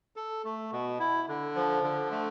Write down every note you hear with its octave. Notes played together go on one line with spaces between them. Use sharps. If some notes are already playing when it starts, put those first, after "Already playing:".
A4
A3
B2
E4
D3
F3
D3
A3